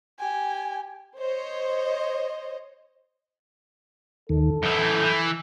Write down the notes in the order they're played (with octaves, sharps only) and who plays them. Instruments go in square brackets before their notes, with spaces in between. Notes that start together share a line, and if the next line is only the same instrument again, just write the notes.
[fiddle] G4 [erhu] G#5
[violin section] C5 C#5 D#5
[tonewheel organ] D#2 D#3 [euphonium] A4
[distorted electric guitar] F#2 E3 [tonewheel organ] G6
[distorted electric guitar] E3